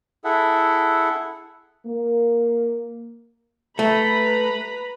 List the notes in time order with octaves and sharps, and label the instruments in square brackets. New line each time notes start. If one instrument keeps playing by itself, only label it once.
[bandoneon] E4 G#4 A4 E5 F#5
[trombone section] A#3
[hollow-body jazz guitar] A3 [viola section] B4 A#5 B5